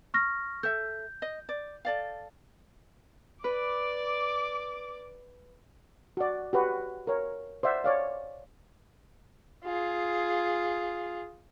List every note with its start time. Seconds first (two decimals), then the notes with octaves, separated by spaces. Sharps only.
0.14 C#6 F6 A#6
0.63 A4 E5 G6
1.22 D#5
1.49 D5
1.85 A4 D5 F5
3.44 B4 D5 D6
6.17 F#4 D5
6.53 F#4 G4 B4
7.07 A#4 C#5
7.63 C5 D5 E5 F#5
7.84 C#5 D5 F5
9.64 F4 G#4